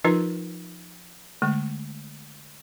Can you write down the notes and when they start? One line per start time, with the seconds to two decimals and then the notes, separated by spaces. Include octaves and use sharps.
0.04 F3 D#4 F4 A#4 B4 A#5
1.42 D3 G#3 A3